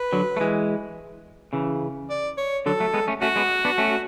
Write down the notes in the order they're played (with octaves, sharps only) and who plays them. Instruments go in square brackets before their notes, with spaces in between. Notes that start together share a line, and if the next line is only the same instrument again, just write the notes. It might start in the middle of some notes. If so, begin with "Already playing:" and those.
Already playing: [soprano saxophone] B4
[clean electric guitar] D3 F#3
A3
E3 G#3
C#3 E3
[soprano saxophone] D5
C#5
[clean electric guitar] D3 F#3 [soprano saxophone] A4
[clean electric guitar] F#3 A3
G#3 B3
A3 C#4
[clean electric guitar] A3 C#4 [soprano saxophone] F#4
[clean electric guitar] G#3 B3
B3 D4
A3 C#4